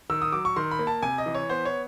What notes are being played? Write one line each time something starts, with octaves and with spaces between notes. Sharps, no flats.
D#3 E6
D#6
F#3 D6
C#6
D#3 C6
B5
A#3
A5
C3 G#5
D#5
E3
C#5
B3 C5
C#5